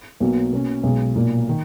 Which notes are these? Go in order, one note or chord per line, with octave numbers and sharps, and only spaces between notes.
B1 B2 F#3 A#3
B2 A#3 C#4
B1 B2 G#3
B1 A#2 A#3
D#3